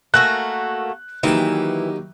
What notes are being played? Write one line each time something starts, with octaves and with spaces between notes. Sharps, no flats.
A3 A#3 F#4 F#5 G#5 E6 F#6
D#3 E3 F#3 A#3 D#4 G4